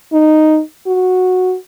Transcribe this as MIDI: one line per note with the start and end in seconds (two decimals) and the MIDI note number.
0.13 0.61 63
0.87 1.56 66